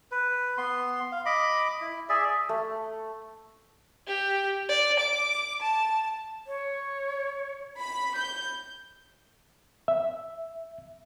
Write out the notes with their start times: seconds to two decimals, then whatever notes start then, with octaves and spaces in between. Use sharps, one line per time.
0.12 B4
0.58 B3 C6
1.12 F5
1.26 D#5 B5 D6
1.81 E4
2.09 G#4 D5 E5
2.49 A3
4.07 G4
4.69 D5
4.99 D6
5.62 A5
6.47 C#5
7.79 B5
8.18 G6
9.88 E5